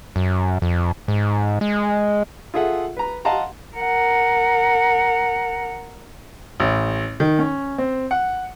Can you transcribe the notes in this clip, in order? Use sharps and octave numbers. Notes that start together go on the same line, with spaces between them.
F#2
F2
G#2
G#3
F4 G#4 A4 E5 F#5
B4 A#5
D#5 F5 F#5 A5 A#5 C6
A#4 F#5
A1
D#3
C#4
C4
F#5